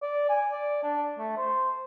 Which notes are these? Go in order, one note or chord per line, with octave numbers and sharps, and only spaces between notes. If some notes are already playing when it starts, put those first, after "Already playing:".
D5
G#5
D5
D4
A3
C5